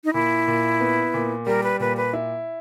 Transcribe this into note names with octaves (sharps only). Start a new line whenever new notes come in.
D#4
A#2 E4
A#2
B3
A#2
G3 A#4
B4
A#2 B4
B4
E4